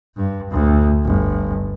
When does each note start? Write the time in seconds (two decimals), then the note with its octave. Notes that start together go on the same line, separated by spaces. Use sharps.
0.16 G2
0.51 D2
1.05 G1